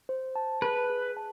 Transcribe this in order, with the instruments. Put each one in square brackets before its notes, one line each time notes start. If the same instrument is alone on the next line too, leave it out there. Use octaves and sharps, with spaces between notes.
[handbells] C5
A5
[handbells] G#4 [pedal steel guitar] B4
[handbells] G#4
A5